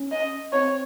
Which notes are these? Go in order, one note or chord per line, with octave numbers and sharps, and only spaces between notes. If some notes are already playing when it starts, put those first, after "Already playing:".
Already playing: C#4
D#5
C4 C#5